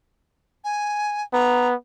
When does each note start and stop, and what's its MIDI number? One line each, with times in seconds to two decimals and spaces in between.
0.64 1.23 80
1.33 1.75 59
1.33 1.67 82